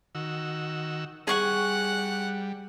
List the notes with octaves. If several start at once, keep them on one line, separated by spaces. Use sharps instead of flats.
D#3 F#4 E6
G3 G#4 F#5 C#6